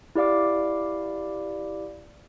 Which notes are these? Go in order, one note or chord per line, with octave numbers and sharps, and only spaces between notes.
E4 G4 D5 F5 D6